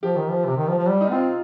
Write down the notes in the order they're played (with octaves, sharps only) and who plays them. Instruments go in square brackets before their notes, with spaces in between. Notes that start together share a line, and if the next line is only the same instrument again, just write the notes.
[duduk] F3 [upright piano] G4
[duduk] D#3
F3
C3
D#3
F3
F3
G3
[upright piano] D#4
[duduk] C4 [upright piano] F4